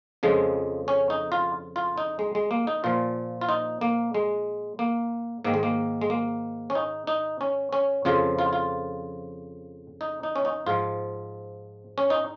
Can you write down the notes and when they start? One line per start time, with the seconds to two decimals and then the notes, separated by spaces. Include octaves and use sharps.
0.23 F2 C#3 F3 G#3
0.88 C#4
1.10 D#4
1.32 F4
1.76 F4
1.98 D#4
2.19 G#3
2.35 G#3
2.51 A#3
2.67 D#4
2.84 A#2 F3 F4
3.41 F4
3.49 D#4
3.81 A#3
4.14 G#3
4.79 A#3
5.44 G#2 D#3 A#3
5.54 G#3
5.63 A#3
6.01 G#3
6.10 A#3
6.70 C#4
6.75 D#4
7.07 D#4
7.41 C#4
7.73 C#4
8.05 F2 C#3 F3 F4
8.39 F4
8.53 F4
10.01 D#4
10.23 D#4
10.36 C#4
10.45 D#4
10.66 G#2 F3 F4
11.98 C#4
12.10 D#4